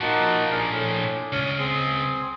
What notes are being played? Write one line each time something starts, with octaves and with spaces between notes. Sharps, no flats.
A#2 F3 A#3 D#4 F#4 A5
D4 G#4 A#4
A2
C#2 C#4
C4 G#4